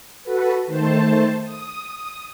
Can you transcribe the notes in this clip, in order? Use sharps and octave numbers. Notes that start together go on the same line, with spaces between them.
F#4 A4 B4
D#3 A3 C5 A5
D#6